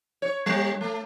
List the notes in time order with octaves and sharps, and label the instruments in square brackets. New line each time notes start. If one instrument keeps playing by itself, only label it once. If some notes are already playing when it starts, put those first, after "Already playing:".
[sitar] C#5
G3
A3